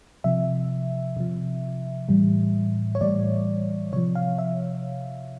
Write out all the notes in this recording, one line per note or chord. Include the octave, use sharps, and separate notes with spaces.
C3 F3 E5
C3 F3
A2 E3 G3
C#5
A2 E3 G3 D5
C3 F3 C#5
F5
E5